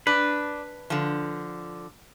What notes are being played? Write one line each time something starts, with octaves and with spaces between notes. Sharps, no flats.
D4 B4
D3 F3